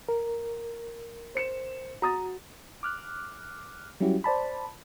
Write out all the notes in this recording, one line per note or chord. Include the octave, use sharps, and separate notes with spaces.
A#4
C5 C#7 E7
F#4 A#5 D#6 A6
D6 F6 F#6
F#3 G3 C#4 E4 F#4 G4
C5 D5 A5 B5